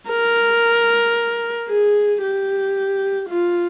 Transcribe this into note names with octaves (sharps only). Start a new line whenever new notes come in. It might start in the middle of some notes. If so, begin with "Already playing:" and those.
A#4
G#4
G4
F4